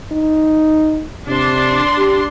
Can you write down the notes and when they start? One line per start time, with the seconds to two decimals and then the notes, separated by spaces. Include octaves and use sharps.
0.12 D#4
1.28 C3 D4 C6
1.98 G4